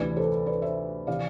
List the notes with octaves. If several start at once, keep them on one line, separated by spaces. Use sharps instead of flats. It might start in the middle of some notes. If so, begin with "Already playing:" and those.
Already playing: D2 C3 E3 B4 D5
A4 C5
B4 D5
C5 E5
C3 E3 D5 F5